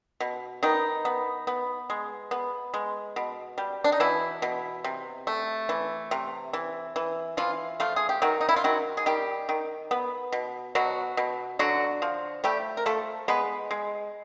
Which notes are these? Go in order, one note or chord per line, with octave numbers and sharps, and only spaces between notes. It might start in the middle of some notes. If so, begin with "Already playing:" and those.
B2
D#3 B3 D#4
B3
B3
G#3
B3
G#3
B2
G3
D4
D#4
B2 E3 E4
B2
C3
A3
E3
C3
E3
E3
E3 F3 F4
F3 A3 F4
G#4
G4
D#3 F#3 F#4
D#4
E4
F4
D#3 F#3 F#4
G#4
D#3 G3 G4
D#3
B3
B2
B2 F#3 F#4
B2
D3 F#3 F#4
F3
G3 A3 G4
A#4
F3 A3 A4
G#3 B3 B4
G#3